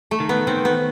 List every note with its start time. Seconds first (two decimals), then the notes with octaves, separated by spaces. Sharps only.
0.11 A3
0.20 D#3
0.29 B3
0.47 D#3 C4
0.65 B3